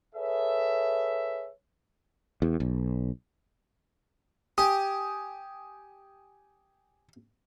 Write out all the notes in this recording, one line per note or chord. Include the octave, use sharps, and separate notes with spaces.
G#4 A4 B4 C#5 E5
E2
B1
G4 G#5 D#6